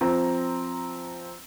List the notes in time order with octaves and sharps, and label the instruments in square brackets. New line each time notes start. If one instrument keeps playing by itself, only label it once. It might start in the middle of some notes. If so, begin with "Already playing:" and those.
[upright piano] F3 C4 A#5